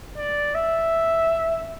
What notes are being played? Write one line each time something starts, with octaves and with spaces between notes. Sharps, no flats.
D5
E5